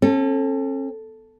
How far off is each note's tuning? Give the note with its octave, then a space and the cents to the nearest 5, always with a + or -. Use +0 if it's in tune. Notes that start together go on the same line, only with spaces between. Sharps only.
C#4 -45 A4 +0